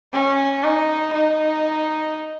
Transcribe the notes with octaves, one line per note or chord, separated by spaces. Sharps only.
C#4
D#4
D#4